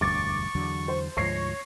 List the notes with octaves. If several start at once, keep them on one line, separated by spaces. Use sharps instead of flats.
E1 D2 G2 C#6 D6 A6
E2 D3 F#3
C5
D2 G#2 F3 C#5 C#6 A#6 C7